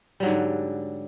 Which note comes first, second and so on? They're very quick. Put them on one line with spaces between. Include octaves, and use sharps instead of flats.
G3 F#3 G#2 D3